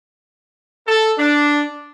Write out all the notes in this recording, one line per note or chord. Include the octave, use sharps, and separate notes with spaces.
A4
D4